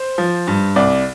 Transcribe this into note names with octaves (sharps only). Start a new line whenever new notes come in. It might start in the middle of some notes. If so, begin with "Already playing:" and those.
Already playing: C5
F3
G2
C2 D5